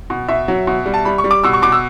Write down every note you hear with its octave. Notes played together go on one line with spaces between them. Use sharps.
B2
B2 E5
F#3
B2
G3
A5
G3 B5
C#6
G3
D6
B2 E6
C#6
B2 D6
E6